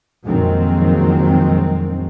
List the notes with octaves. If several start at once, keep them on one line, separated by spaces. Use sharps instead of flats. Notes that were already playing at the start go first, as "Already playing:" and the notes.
A#1 F2 D#3 F#3 G#3 C4